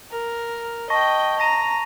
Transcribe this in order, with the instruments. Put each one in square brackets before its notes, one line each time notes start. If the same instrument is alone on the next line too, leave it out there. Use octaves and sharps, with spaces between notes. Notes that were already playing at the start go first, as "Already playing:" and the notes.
[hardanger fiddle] A#4
[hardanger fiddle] D#5 G5 [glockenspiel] A5 C#6 A#6
[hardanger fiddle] A#5 [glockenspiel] A#6 D#7